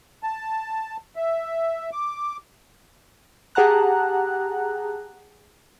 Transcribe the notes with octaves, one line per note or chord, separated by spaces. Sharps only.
A5
E5
D6
G4 G#4 F#5 A5 A#5 F#6